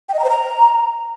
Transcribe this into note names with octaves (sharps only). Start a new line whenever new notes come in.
G5
D#5
A#5
C5
A#5